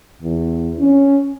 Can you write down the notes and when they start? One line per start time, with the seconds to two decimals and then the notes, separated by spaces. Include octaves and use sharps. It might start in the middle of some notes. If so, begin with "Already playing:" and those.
0.22 E2
0.79 C#4